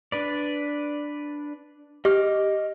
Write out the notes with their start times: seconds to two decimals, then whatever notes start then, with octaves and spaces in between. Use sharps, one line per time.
0.12 D4 B4 D5
2.05 G4 D#5 D6 F6